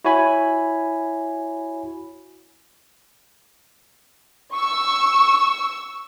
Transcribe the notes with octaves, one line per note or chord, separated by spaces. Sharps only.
E4 F#4 C#5 G#5 B5
C#6 E6